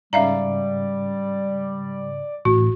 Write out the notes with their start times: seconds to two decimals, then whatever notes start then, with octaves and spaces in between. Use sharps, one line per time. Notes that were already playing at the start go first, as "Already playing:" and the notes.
0.13 G#2 C#3 G3 D5 E5 F5 A#5
2.45 A1 A2 F#4